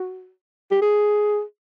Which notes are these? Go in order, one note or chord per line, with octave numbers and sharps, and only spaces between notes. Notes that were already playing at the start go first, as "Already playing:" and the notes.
Already playing: F#4
G4
G#4